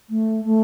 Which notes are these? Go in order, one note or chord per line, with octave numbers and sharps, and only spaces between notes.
A3
A3